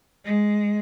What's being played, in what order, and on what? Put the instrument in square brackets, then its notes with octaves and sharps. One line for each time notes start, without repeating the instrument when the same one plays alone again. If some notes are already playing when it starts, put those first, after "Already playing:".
[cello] G#3